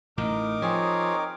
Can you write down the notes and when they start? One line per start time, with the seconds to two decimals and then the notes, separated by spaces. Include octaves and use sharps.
0.18 A1 A2 D#4 A#4 D6
0.62 F3 C4 G#4 C#5